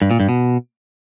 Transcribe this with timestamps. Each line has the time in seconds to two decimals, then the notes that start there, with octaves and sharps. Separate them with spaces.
0.02 G2
0.11 A#2
0.20 G2
0.29 B2